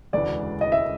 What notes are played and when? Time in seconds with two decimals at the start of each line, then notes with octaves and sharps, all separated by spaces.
0.13 E1 D2 C#3 E3 G#3 D5
0.61 D#5
0.72 E5